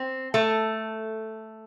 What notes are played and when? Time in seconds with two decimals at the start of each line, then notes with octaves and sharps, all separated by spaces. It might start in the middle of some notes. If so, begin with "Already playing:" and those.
Already playing: C4
0.34 A3